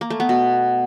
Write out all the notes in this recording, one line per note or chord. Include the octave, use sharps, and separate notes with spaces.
A#3
A3
B3
B2